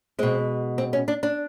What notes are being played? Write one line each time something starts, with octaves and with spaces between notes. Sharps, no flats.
B2 G#3 C4
C4
C#4
D4
D4